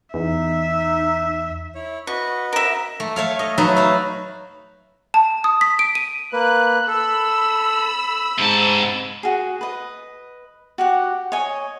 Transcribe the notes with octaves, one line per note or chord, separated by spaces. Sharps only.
E2 D#4 E5
E4 C#5
F#4 B4 D#5 C#6
A#4 E5
A3
A3 C#5 F5
D#5
F#3 D#4 A4 B4 E5
F#4 F5
A5
D#6
B6
D7
D#7
A#3 B4 F#6
A4 B5 E6
G#2 C3 A5
F#4 G#4
B4 D#5
F#4 G4 F#5
C#5 D#5 G#5